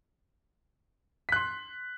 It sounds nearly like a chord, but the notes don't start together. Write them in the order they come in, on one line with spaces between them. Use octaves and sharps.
B6 F#6 C6